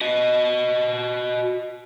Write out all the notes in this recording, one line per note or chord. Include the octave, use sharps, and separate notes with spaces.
F#4 D#5